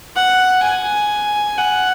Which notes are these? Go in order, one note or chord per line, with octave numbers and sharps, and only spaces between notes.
F#5
G#5
F#5